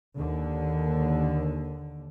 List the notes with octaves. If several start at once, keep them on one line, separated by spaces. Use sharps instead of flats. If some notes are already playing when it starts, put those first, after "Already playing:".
D#2 D3